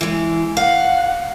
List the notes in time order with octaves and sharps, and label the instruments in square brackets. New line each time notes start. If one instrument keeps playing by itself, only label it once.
[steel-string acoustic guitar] E3 G#3
[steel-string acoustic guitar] F5 [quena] F#5